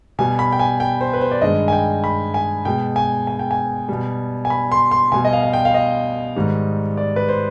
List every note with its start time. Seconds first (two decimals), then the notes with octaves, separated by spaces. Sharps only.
0.19 B2 G3 G#5
0.39 B5
0.52 G5
0.59 G#5
0.80 G5
1.01 C5
1.13 B4
1.21 C5
1.32 D5
1.41 G2 D#3 G#3 D#5
1.68 G#5
1.73 G5
2.04 B5
2.34 G#5
2.65 B2 G#3 G5
2.96 G#5
3.27 G#5
3.39 G5
3.51 G#5
3.89 B2 G3
4.45 G#5
4.50 B5
4.72 C6
4.91 C6
5.12 B2 G3 G#5
5.25 D#5
5.33 F5
5.43 F5
5.53 G5
5.65 F5
5.74 D#5
6.36 G#2 D#3 G3
6.97 D5
7.16 B4
7.29 C5